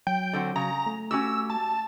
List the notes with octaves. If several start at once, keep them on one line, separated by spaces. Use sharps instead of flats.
F#3 G5
D3 C4 F#4
C#3 A#5
A3
C#4 F#4 G4 E6
A5